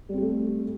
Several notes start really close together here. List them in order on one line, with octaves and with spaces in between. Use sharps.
G3 C4 G4 A3